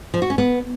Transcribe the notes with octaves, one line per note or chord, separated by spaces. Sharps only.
F3
F#4
C#4
B3